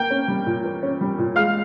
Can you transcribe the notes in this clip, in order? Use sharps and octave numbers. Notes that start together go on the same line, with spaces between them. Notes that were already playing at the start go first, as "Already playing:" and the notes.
Already playing: A#3 G5 G6
C#4
G3
A#2
A#3
C#4
G3
A#2
G#3 F5 F6